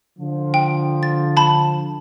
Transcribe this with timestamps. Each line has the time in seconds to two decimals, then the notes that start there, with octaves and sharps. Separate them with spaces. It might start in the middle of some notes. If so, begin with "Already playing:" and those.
0.19 D3 F3
0.54 G5
1.03 A6
1.37 A5 B5 E7